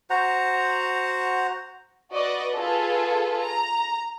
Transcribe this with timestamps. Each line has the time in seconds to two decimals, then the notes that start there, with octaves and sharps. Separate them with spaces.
0.10 F#4 C5 F#5 A#5
2.12 F#4 B4 D5 D#5
2.54 F4 G#4 A4 B4
3.42 A#5